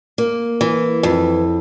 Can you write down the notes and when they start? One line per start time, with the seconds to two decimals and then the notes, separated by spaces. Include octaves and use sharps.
0.18 A#3
0.61 E3
1.03 F2